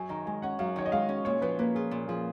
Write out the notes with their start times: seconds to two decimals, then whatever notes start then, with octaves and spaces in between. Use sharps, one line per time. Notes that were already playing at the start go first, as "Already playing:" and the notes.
Already playing: F#2 G#5
0.09 D#3 A#5
0.26 G#3 G#5
0.42 C#4 F#5
0.59 F#2 F5
0.76 D#3 C#5
0.86 D#5
0.92 G#3 F5
1.09 C#4
1.25 A#2 C#5
1.41 F3 B4
1.59 A#3 B4
1.75 F4 G#4
1.91 A#2
2.08 F3 G#4